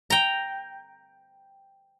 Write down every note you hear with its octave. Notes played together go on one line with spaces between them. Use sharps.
G5 A#5